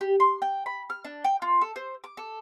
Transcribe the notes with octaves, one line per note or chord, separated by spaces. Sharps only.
G4
C6
G5
B5
F6
D4
G5
F4
A4
C5
D6
A4